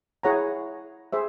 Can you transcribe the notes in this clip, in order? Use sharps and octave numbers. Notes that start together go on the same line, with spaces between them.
E4 G#4 C#5 F#5 A#5
G#4 C5 E5